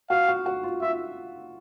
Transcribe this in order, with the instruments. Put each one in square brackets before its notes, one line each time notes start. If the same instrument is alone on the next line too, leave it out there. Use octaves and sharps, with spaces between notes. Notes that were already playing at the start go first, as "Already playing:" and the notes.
[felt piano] F#4 [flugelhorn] F5
[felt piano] F#4
F#4
F4
[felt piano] F4 [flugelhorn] E5